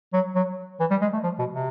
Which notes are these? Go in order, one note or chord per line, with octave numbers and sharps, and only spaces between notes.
F#3
F#3
E3
G3
G#3
A3
F3
B2
C3